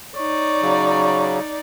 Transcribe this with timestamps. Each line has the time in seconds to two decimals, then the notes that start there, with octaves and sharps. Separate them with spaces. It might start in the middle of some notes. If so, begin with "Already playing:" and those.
0.17 D#4 C#5 D5
0.63 C#3 F#3